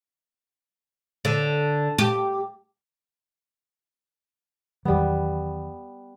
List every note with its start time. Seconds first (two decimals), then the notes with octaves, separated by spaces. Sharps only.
1.25 D3
1.98 G4
4.85 E2 D#3 F#3 G3 B3